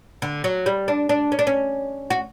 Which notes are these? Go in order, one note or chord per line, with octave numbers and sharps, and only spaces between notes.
D3
F#3
G3
D4
D4
C#4
D4
C#4
F#4